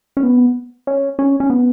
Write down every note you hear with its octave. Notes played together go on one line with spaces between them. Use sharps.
C#4
B3
C#4
C#4
C#4
B3